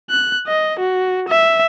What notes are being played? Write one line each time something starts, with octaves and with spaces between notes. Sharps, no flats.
F#6
D#5
F#4
E5